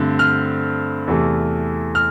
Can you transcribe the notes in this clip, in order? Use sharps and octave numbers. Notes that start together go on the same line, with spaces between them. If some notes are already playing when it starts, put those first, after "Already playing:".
Already playing: G2 D3 A3 C4
F6
E2 C3 E3 A3
F6